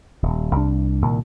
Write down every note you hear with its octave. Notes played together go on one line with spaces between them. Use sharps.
D#1
C2 D4
C2 A#2 D#3